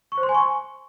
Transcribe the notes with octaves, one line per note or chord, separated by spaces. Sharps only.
C#6
C5
C6
G#5
C#6